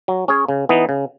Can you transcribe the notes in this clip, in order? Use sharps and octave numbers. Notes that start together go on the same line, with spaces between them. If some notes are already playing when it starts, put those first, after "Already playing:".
F#3
C#4 G#4 C#5
C#3
E3 B3 D#4
C#3